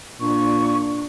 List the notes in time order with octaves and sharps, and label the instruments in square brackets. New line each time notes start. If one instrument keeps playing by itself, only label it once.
[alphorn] A#2 [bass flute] D4 [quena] C#6